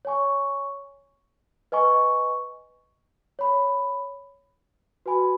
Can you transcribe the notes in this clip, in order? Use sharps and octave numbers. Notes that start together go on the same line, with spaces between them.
C#5 G#5 C#6
B4 D#5 G#5 C#6
C#5 B5
F#4 B4 G#5 B5